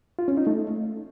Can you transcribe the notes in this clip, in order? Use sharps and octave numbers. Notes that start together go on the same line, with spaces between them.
F4
C#4
D#4
A3